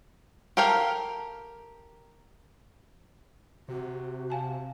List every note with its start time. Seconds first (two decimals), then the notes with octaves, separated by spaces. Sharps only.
0.57 G4 A4 A#4 F5 G5
3.68 C3 F#4
4.30 F5 G#5 A5